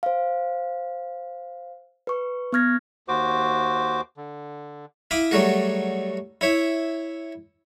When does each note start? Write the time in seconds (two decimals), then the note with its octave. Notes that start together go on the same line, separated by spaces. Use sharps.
0.03 C5 F5
2.07 B4 C#6
2.53 B3 C#6 F6 G#6 A#6
3.08 D#2 F#4 C5 D6
4.17 D3
5.11 E4 F5 B5 D6 D#6
5.31 F#3 G3 A3 F#4 G#4
6.41 E4 C#5 E5